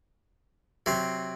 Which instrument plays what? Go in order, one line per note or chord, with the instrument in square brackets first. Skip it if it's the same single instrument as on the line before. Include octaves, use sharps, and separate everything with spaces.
[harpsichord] C3 F#3 C4